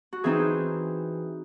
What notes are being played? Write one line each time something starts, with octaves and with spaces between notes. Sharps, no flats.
F#4
E3 C4 D#4 G#4